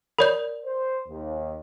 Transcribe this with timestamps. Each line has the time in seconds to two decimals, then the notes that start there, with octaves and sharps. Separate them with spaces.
0.19 A#4 C#5 D5 B5 G6
0.65 C5
1.08 D#2